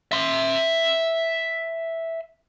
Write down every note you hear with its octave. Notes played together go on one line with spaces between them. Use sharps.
E5 C6